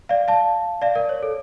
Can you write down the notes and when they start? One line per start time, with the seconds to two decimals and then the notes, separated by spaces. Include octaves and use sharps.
0.09 D5 F5
0.28 F5 A5
0.82 D5 F5
0.95 A#4 D5
1.09 C#5
1.23 A4